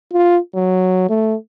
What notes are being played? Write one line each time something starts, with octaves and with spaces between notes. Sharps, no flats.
F4
F#3
A3